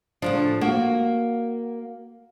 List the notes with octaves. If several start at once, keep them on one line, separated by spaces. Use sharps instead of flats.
A2 C#3 F3 D4
A#3 F#4